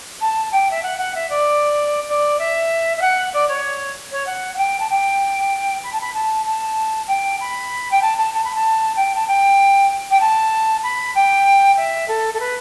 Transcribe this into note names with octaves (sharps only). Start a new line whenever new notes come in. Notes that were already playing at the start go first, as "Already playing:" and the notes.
A5
G5
E5
F#5
F#5
E5
D5
D5
E5
E5
F#5
D5
C#5
C#5
F#5
F#5
G5
A5
G5
B5
A5
B5
A5
A5
G5
B5
G5
A5
A5
A5
B5
A5
G5
A5
G5
G5
A5
B5
G5
E5
A4
A4
B4